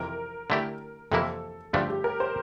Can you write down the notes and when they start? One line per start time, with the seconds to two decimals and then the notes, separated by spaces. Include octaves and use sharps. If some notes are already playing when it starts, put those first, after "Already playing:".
Already playing: F2 C3 E3 A#4
0.50 D3 A3 E4 G4
1.12 F2 C3 E3 A#3 E4 A4
1.73 G2 D3 F3 A3 D4 G4
1.89 G4
2.04 A#4
2.20 C5